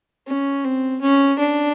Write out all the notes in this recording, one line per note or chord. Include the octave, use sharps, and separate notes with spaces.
C#4
C4
C#4
D4